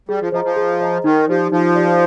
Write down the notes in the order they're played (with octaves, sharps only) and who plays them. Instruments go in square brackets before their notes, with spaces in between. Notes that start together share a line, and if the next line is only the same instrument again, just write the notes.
[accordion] G3 [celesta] G#4
[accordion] F3
[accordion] F3 [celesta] C5 D#5 A#5
[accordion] F3
[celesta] G#4
C5 D#5 A#5
[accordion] D#3 [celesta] D#4
[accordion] F3 [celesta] G4 D5
[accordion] F3 [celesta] D#4
[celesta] G4 D5